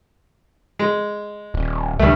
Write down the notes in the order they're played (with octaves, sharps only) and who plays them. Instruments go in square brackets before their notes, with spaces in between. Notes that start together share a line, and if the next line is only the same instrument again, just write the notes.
[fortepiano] G#3
[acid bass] D#1
[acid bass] C2 [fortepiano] G2 A3